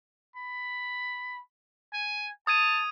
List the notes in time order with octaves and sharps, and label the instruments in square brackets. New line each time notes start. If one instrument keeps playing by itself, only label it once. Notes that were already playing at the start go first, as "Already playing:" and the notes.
[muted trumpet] B5
G#5
[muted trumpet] A5 [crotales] D#6 G#6 D#7